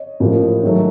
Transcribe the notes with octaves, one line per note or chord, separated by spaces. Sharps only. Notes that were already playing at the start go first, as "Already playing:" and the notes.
Already playing: C#5 D#5
A1 A2 F3 A#3
G#2 D#3 F#3 A3